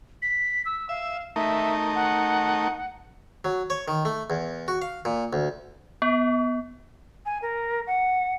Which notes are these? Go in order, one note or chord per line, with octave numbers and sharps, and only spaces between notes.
B6
E6
E5 F5
A3 D#4 A#4 E5
F#5
F#3
C#5
D#3
A3
E2
F#4
F5
A#2
D2
B3
G#5
A#4
F#5